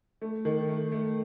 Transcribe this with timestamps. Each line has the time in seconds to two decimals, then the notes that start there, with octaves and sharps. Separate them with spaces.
0.21 A3
0.45 D#3
0.69 A3
0.92 A3